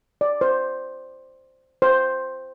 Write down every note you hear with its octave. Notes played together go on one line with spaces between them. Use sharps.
D5
C5
C5